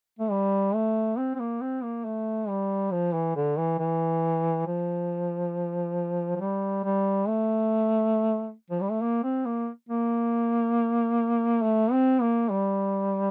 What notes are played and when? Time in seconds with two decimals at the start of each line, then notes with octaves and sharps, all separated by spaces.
0.19 A3
0.31 G3
0.75 A3
1.18 C4
1.35 C4
1.40 A#3
1.62 C4
1.83 A#3
2.05 A3
2.49 G3
2.92 F3
3.14 E3
3.36 D3
3.57 E3
3.79 E3
4.67 F3
6.36 F3
6.40 G3
6.84 G3
7.28 A3
8.70 F3
8.81 G3
8.91 A3
9.02 A#3
9.24 C4
9.46 A#3
9.89 A#3
11.63 A3
11.92 C4
12.21 A#3
12.50 G3